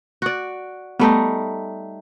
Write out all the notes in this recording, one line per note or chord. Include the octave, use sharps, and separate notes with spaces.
F#4 D5
G3 A3 B3 D#4